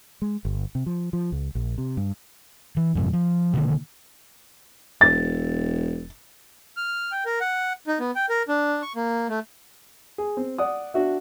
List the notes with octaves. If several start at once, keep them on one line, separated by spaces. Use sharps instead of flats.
G#3
G1
C3
F3
F3
C#2
A#1
C3
G2
E3
F2 G#2 C3
F3
B2 D3 D#3 A#3
E1 A6
F6
G5
A#4
F#5
D#4
B3
G5
A#4
D4
C#6
A#3
A3
G#4
C4
D5 F#5 D#6
D4 F#4 E5